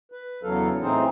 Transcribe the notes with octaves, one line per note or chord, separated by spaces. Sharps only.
B4
E2 C#3 F#3 A4 F5
A2 E3 C4 D#4 G#4 C5